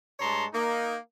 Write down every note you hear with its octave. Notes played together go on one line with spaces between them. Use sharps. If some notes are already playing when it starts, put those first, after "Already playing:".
G2 G#3 C#5 A5 A#5 C6
A#3 D#4